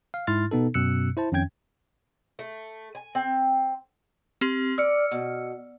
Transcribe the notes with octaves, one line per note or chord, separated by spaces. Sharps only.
F5
G#2 E4 C6 F6 A6
B2 B3 D#4 A4
F#2 B2 E6 F#6 C#7
E4 C5 A5
F2 D#3 C#4 G5 G#6
A3
G#5
C4
C4 G4 C6
D5 E6 F6 C#7
B2